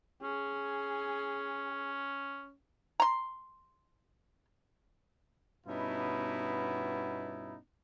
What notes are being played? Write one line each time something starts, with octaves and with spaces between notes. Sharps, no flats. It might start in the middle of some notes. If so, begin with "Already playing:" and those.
C#4 G#4
A#5 C6
G2 B2 B3 C#4 D#4 E4